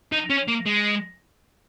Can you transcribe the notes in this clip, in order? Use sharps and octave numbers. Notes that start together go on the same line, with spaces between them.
D#4
C#4
A#3
G#3